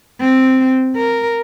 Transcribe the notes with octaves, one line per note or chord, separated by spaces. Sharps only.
C4
A#4